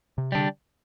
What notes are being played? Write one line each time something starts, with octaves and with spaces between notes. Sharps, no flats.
C3
D3 G3 D4